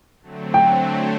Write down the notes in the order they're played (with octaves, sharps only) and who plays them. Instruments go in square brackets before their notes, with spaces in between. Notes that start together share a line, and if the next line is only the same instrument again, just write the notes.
[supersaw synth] D3 F#3 A3 C4
[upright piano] G5